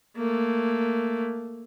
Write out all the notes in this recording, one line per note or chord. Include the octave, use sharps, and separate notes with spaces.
A3 A#3